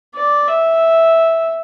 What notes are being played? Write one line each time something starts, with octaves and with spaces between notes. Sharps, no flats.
D5
E5